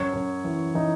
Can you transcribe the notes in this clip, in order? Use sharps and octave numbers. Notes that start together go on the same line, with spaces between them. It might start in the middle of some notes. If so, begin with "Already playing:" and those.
Already playing: F#2 C#5
F#2
E3
E3 D#4